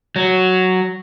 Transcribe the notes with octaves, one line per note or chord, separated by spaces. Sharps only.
F#3